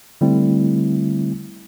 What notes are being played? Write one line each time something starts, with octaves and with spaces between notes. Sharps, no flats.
D3 G3 A3 C4 E4